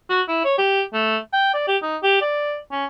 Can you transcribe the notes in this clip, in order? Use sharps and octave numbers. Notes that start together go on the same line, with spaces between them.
F#4
E4
C#5
G4
A3
G5
D5
G4
D#4
G4
D5
C#4